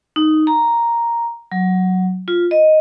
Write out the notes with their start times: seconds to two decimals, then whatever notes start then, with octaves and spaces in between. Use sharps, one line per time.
0.16 D#4
0.47 A#5
1.52 F#3
2.28 F4
2.51 D#5